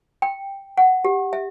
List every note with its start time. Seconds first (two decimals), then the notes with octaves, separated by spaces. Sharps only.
0.22 G5
0.77 F#5
1.05 G4
1.33 E5